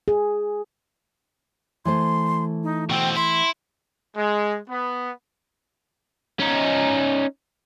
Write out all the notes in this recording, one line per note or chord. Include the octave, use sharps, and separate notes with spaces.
G#4
E3 A3 C5 C6
D#4
B2 C4 G5
E4 C6
G#3
B3
C#4 D#4